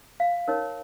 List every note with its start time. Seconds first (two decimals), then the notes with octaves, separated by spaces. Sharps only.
0.20 F5
0.48 D#4 A#4 C#5